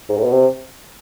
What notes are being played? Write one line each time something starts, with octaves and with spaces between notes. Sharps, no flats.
G#2
A2
B2
C3